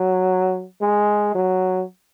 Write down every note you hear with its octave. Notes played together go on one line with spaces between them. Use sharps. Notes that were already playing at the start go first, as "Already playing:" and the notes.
Already playing: F#3
G#3
F#3